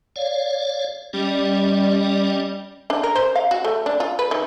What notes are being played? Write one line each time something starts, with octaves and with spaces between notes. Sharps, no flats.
C#5 D5 F5
G3 C#4 D5 D#5
D4
A#4
C5
F5
F#4
A3
D4
F4
B4
D#3